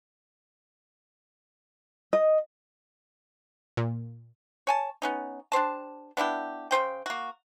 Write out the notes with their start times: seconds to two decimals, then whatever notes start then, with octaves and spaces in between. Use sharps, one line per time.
2.13 D#5
3.77 A#2
4.67 C#5 G#5 A5
5.02 B3 C#4 D#4
5.52 D4 G4 C5 A5
6.17 B3 D4 E4 G4
6.71 C#3 D4 C5 G5
7.06 A#3 F#4